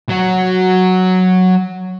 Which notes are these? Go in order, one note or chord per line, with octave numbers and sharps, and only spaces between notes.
F#3 F#4